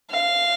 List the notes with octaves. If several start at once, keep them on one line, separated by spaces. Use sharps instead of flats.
F5